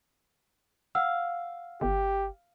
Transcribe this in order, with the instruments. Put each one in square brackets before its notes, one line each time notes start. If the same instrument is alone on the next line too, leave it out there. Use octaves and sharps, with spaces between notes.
[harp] F5 [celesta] F#5 E6
[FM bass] G1 [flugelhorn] G4